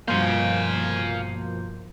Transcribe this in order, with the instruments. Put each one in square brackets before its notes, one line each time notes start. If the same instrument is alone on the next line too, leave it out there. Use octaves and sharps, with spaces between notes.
[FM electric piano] G2 C6 G6 [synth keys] B2 F3 A#3 [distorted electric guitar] F5 G#5